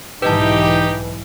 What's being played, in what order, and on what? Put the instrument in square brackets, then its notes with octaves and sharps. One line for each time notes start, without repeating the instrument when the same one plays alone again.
[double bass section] B1 G#2 E3 [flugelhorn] D#4 [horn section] G4 [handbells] B4 D#5 A5